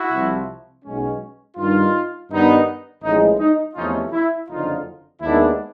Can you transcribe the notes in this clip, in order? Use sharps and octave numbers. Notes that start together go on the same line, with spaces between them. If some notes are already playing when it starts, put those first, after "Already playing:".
Already playing: E4 F#4
C2 C3 F3
B1 B2 G#3 C#4
G2 D#3 G3 D#4 F4
G2 D#3 G3 B3 D#4
A1 A2 F3 G#3 D#4
D#4
E2 C3 F3 A3 C#4 D#4 F4
E4
F#1 F2 D3 D#4 F4
D#2 D#3 G#3 B3 D4 E4